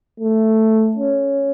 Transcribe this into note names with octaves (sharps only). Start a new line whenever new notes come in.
A3
C#4